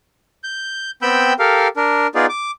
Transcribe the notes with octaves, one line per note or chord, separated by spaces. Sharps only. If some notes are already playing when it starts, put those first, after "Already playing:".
G6
B3 C4 G5 B5 E6 G6
G4 A4 A#4 F5
D4 A#4
B3 D#4 F4 G#4 D5
D6